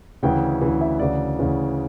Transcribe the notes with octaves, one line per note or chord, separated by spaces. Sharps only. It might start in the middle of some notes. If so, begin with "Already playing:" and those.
D2 C#3 E3 G5
D2 C#3 E3
E5
D2 C#3 E3 D5
D2 C#3 E3